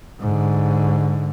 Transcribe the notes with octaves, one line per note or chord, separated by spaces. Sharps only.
G#2 D3